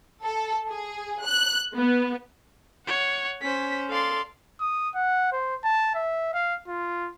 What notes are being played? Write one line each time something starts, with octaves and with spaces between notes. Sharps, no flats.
A4
G#4
F#6
B3
C#5 F#5
C#4 C5 B6
A4 D5 F5 C6
D#6
F#5
C5
A5
E5
F5
F4